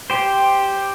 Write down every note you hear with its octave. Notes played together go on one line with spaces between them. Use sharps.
G4 C5